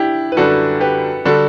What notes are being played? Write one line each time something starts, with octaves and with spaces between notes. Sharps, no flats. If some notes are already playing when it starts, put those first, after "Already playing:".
Already playing: D4 E4 G4
B4
F#2 D3 G3 D4 F#4 A4
G4 B4
D3 G3 D4 F#4 A4